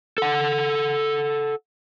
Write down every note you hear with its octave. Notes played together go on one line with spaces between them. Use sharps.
A4 F#5